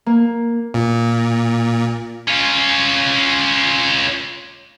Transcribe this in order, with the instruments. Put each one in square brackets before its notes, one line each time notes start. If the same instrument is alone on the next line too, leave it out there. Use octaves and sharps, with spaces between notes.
[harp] A#3
[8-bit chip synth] A#2
[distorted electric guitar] C#4 F4